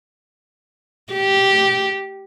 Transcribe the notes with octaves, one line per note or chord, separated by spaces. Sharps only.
G4